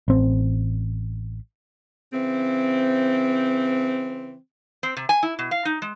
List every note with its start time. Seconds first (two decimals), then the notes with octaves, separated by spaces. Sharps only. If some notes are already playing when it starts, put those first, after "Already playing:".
0.08 A1 C4
2.13 C#3 E3 C4
4.83 C4
4.97 C3
5.09 G#5
5.23 E4
5.39 B2
5.51 F5
5.65 D#4
5.82 G#3